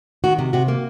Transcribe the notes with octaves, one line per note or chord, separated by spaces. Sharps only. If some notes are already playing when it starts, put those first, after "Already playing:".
D#3 F#4
C3
C3 F#4
A#3